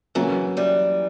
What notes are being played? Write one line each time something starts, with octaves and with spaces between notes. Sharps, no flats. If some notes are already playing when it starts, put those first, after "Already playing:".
C#3 E3 F#3 A#3 C#4
E3 G3